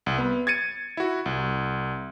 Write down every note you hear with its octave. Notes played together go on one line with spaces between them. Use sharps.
C2
B3
G#6 A6 C#7 D#7
E4 F#4
C2